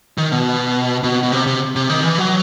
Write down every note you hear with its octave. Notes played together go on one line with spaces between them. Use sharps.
D#3
B2
B2
B2
C3
C3
C3
D#3
E3
F#3